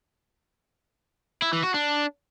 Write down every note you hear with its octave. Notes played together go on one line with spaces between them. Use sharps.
E4
E3
F#4
D4